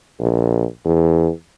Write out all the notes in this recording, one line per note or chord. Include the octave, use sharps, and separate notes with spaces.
A#1
E2